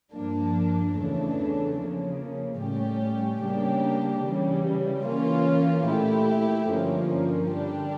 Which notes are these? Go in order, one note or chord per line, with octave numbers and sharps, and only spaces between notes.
G2 F3 A#3 D4
E2 C#3 E3 A3 D4
C#3 F3 A#3
A2 G3 C#4 G4
C#3 G3 A#3 D4 G4
C#3 E3 G3
E3 A#3 C#4 F4
A#2 A3 E4 G4
G2 D3 F3 A#3 C#4
D3 G3 D4 G4